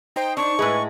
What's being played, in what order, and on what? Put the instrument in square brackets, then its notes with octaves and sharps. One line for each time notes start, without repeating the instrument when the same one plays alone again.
[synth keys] D#4 C5 [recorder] G5
[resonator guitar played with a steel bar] D4 [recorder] C#6
[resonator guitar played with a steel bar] A2 G#3 [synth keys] G#4 B4 G#5